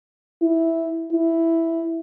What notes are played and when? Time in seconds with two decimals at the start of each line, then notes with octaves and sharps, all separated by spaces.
0.42 E4
1.12 E4